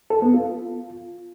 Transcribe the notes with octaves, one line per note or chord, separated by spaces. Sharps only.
A4
B3
F4